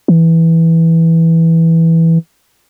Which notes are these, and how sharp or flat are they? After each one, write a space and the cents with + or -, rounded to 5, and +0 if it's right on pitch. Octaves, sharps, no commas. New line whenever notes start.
E3 -5